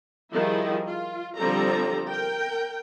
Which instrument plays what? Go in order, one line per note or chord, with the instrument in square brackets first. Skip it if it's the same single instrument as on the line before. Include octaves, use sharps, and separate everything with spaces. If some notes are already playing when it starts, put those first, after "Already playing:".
[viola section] D#3 F3 G3 E4 G#4
F4
D3 F3 G3 C4 A4 A#5
A#4 G5